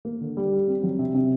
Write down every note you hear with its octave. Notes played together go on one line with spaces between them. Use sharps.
A#3
D3
G3
G4
C4
F#3
C3
C3